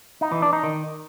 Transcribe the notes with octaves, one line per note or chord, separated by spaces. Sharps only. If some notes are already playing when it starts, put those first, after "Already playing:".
D#4
E3
D4
D#4
D#3